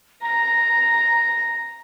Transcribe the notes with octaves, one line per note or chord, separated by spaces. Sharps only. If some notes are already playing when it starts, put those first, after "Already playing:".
A#5 A#6